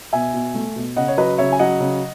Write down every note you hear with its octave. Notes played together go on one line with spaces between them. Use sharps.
B2 E5 G#5
B2
A3
B2
C#3 D#5 F#5
C#5
F#3 B4 D#5
C#3 C#5 E5
G#5
F#3 D#5 F#5
C#3